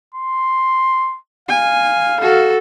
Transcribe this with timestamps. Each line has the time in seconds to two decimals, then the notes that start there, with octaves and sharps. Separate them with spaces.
0.14 C6
1.49 F5 G#5
2.20 F#4 A4